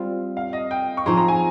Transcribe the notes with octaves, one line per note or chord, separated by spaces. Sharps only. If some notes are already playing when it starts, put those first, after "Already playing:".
Already playing: G3 C4 F4
F5
D#5
G5
C#6
F3 C4 D#4 G#4 C6
A#5
G#5